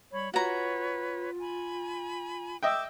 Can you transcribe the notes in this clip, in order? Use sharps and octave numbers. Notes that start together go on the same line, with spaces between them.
G3 C#5 B5
F4 F#4 B4 C#5 A#5
G#5 B5
D#5 E5 G5 D6 E6